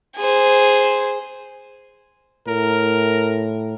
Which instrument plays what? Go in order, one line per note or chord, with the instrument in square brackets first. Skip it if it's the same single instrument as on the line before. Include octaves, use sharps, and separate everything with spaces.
[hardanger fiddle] G#4 C5
[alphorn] A2 [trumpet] A#4